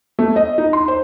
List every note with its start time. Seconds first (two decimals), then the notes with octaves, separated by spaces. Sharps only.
0.19 A3
0.36 D#5
0.58 D#4
0.73 C6
0.88 C5